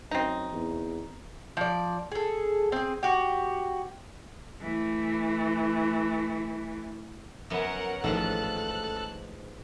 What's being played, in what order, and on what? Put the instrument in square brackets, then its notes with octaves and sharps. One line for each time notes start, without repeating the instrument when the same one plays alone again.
[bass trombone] F#2 [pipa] C4 D#4
[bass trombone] E2
[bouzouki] F3 D5
G#4 A4
C4 G#4
F#4 G4
[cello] E3 A3
[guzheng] F#2 B3 C#4 [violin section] A#4 F#5
[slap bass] A1 D#3 [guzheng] G#2 F3 F4 [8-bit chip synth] A4 A5 [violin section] F#6